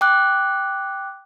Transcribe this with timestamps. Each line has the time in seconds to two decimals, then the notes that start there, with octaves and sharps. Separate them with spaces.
0.01 G5 D6 F#6